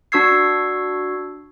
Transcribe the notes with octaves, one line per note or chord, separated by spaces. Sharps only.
D4 F#4 C#6 E6 G#6 C7